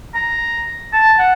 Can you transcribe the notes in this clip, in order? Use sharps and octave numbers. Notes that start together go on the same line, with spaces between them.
A#5
A5
F#5